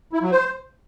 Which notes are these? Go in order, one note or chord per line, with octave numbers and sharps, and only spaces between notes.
E4
F#3
C5